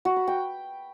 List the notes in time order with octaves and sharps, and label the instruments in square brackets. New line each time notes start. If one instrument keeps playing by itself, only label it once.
[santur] F#4
B5
G5